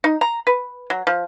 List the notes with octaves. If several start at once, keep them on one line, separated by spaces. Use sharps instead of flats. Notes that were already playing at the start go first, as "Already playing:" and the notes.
D#4
A#5
B4
F#3
F3